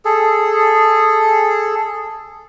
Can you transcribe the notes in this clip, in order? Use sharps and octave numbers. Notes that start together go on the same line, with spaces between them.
G#4 A4